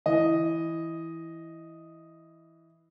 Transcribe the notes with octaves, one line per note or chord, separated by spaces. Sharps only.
E3 D#5